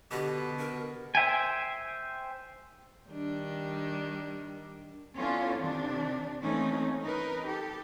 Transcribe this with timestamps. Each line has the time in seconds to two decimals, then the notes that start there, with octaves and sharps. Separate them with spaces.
0.11 B2 D3 G4
0.59 A#4
1.15 C5 E5 G5 G#5
3.10 D#3 G3 D4
5.16 B3 C#4 D4 E4 F4 A4
5.57 C3 D#3 D4
6.42 E3 A3 A#3 C4 C#4 D#4
7.03 D#4 A#4 B4
7.45 G4 A4